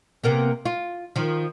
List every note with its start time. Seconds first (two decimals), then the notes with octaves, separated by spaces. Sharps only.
0.24 C3 A#3 B3
0.65 F4
1.16 D#3 F3